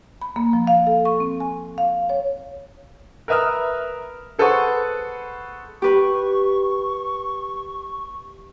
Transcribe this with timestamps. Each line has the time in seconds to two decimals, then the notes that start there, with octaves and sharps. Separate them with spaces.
0.22 B5
0.36 A#3
0.53 F3
0.67 F5
0.87 A4
1.05 C#6
1.20 C4
1.40 G#5
1.78 F5
2.09 C#5
3.28 A#4 B4 E5 D#6 F6
4.39 G#4 A4 B4 C5 F#5 C#6
5.82 G4 B4 C#6